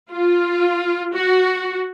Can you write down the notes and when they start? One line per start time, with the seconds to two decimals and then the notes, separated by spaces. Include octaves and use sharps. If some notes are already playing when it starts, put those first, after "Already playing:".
0.10 F4
1.13 F#4